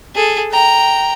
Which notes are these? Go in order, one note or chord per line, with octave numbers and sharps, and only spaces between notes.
G#4 A4
G5 A#5